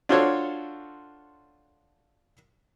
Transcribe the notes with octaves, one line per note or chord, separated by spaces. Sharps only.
D4 F4 F#4 A4 C5 C#5